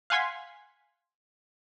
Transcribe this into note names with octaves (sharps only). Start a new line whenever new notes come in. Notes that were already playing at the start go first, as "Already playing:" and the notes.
F5 F#5 G#5 C6 G#6 B6